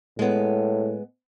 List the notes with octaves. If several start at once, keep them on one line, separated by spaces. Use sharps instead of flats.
A2 G#3 B3